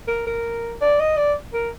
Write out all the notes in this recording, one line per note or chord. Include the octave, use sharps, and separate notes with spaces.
A#4
A#4
D5
D#5
D5
A#4